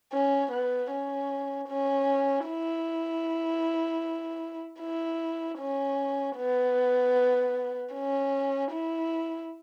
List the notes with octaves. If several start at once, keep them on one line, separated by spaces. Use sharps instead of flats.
C#4
B3
C#4
C#4
E4
E4
C#4
B3
C#4
E4